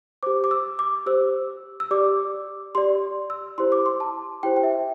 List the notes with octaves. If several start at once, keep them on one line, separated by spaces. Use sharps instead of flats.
G4 C5 D6
D6
E6
D6
G4 C5 E6
E6
G4 D5 D6
G4 D5 C6
E6
E4 G4 C5 C6
D6
C6
A5
E4 G4 C5 G5
G5
E5